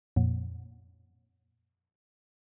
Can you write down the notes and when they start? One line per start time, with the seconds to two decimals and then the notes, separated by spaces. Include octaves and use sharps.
0.16 F2 A#2